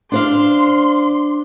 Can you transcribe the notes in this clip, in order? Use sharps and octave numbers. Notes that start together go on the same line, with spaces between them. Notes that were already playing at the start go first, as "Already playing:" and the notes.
D4 C5 F5 C6